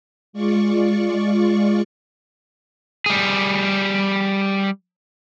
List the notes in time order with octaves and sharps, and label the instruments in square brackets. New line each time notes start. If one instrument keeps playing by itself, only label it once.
[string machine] G#3 F4 D5 C#6
[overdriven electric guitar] G3 G#4